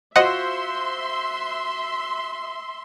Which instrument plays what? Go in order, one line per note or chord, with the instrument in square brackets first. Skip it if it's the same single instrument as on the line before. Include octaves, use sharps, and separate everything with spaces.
[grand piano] F4 F#4 C5 [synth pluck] D#5 F#5 [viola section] E5 C6